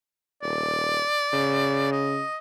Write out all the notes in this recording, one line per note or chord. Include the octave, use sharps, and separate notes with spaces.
D#1 D5
C#3
D#5